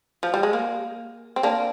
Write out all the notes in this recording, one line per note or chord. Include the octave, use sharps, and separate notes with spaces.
F3
G3
G#3
A#3
C4
A#3 D4